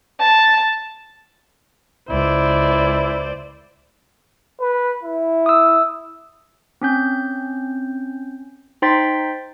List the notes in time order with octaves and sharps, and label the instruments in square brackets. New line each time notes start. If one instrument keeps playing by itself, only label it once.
[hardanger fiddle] A5
[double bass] C#2 [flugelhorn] E4 [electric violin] C5 D5
[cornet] B4
E4
[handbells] D#6 E6
C4 C#4 G6
D#4 C5 G5 C6 A6 B6